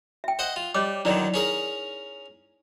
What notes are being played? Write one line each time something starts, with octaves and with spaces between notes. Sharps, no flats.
E5 G5
C5 D#5 F#5
F4
G3 C#5 D#5 D6
D3 D#3 F#3 D#4 E4 D5
C#4 G#4 A#4